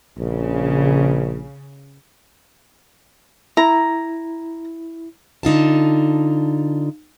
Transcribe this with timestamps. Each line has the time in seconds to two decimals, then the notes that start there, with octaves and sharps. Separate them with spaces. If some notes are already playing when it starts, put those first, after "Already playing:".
0.18 A#1 C#3
3.57 E4 A#5
5.43 D3 D#4 F4 A5